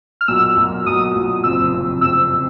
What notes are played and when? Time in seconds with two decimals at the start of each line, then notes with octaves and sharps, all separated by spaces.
0.21 F6
0.28 B1 A#2 F#3 E6
0.57 B1 A#2 F#3
0.86 B1 A#2 F#3 D#6
1.15 B1 A#2 F#3
1.44 F#1 F2 C3 F3 E6
1.73 F#1 F2 C3 F3
2.01 F#1 F2 C3 F3 E6
2.33 C3